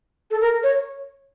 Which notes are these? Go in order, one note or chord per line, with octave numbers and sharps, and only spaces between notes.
A4
A#4
C#5